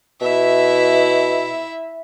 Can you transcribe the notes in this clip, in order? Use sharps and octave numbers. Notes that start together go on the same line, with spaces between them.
B2 E4 E5